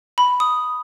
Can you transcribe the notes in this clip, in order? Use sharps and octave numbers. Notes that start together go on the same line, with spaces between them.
B5
D#6